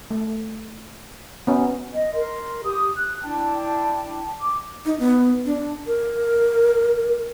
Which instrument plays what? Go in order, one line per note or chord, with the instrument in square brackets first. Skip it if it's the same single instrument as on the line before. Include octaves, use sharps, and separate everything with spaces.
[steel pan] A3
B3 C#4
[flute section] D#5
A#4 C6
G4 D#6
F#6
D4 E4 G5 A5
D6
[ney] D#4
B3
D4
A#4